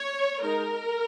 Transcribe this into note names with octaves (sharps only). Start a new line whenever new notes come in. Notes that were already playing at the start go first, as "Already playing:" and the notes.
Already playing: C#5
G#3 D#4 A#4